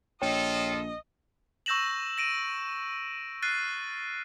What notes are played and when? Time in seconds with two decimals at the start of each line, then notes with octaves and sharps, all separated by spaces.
0.22 A#1 F4 A4 C#5 D#5 G5
1.66 C#6 E6 G6 A#6 E7 F#7
2.18 A#6 D7 D#7
3.42 F6 F#6 A6 C7 D#7